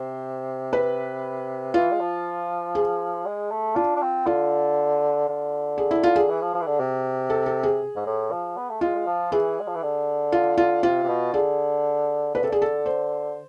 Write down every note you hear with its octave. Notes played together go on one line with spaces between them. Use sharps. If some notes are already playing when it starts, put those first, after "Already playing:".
Already playing: C3 C5
B4
E3 F4
G#3
F3
G#4
G#3
A3
D4 F4
D4
C4
D3 F4
D3
G#4
E4
F4
G#4
E3
F3
F3
E3
D3
C3
A4
A4
G#4
G#2
A2
F3
B3
A3
G#3 F4
G#3
F3
E3 G#4
G#3
F3
E3
D3
F4
F4
C3 F4
C3
B2
D3 G#4
D3 B4
C3 A4
D3 G#4
A4
C5